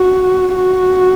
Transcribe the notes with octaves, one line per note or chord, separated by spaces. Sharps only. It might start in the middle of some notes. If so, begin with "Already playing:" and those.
Already playing: F#4
F#4